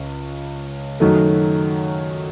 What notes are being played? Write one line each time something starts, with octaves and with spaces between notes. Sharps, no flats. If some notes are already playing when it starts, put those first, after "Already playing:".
Already playing: C#2 C#3
F#2 D#3 F#3 A3